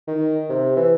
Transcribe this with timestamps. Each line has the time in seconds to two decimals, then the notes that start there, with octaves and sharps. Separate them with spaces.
0.07 D#3
0.50 C3
0.76 E3